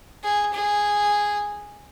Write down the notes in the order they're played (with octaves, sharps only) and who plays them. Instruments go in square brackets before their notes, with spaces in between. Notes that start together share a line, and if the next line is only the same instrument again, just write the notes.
[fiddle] G#4
G#4